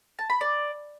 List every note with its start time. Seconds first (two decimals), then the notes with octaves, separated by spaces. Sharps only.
0.19 A5
0.30 B5
0.41 D5